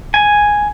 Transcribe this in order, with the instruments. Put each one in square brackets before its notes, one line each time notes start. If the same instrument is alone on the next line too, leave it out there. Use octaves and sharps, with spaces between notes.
[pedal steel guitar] G#5